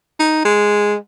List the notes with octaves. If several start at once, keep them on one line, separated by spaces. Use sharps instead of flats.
D#4
G#3